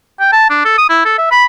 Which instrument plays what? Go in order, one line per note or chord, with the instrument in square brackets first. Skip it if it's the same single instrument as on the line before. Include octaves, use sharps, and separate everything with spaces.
[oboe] G5
A5
D4
A4
D#6
E4
A4
E5
B5